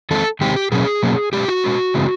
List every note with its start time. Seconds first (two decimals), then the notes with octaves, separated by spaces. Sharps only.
0.11 D#3 G#3 C4 A4
0.41 D#3 G#3 C4 G4
0.56 G4
0.72 B2 F#3 A#3 C#4 G#4
1.03 B2 F#3 A#3 C#4
1.33 B2 G#3 C#4 G4
1.48 F#4
1.64 B2 G#3 C#4
1.94 C#3 E3 G#3 C4